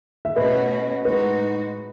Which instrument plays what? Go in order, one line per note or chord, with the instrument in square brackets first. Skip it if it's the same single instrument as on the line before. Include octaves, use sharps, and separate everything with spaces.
[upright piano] E5
[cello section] B2 A3 C#4 F#4 [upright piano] B4 D#5
[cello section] A2 G#3 D#4 F#4 [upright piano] B4